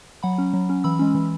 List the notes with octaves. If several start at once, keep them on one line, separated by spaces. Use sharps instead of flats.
F#3 F#5 B5
C#4
F#3
C#4
E3 B5 E6
G#3 C#4
E3